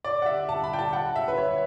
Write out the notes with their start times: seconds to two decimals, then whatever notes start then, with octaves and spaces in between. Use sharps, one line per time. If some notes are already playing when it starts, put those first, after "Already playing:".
0.05 D5
0.22 F#5
0.26 E5
0.49 A5
0.64 B5
0.73 G5
0.79 A5
0.93 F#5
1.16 E5
1.28 B4
1.38 C#5